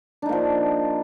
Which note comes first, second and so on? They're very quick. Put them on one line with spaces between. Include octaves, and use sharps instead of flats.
D4 D#4 A#3 F3